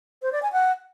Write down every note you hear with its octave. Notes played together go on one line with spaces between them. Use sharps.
C5
D5
G#5
F#5